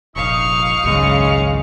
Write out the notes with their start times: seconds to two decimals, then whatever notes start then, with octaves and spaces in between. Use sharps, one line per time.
0.16 F1 A#1 D#4 F5 C#6 D#6
0.84 G#1 C#2 F#2 C#3 G#3